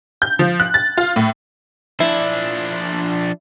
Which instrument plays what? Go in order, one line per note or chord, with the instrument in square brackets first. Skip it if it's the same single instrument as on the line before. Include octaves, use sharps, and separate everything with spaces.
[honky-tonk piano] G6
F3
F#6
A6
F4
A2
[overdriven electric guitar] F3 D4 [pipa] E4